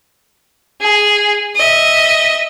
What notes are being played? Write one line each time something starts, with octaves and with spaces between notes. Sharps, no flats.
G#4
D#5 E5